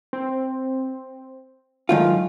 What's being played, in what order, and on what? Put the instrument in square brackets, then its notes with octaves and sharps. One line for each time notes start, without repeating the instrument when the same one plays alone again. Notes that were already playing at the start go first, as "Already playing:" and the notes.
[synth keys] C4
[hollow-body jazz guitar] G#2 D#3 F4 [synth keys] F#3 A3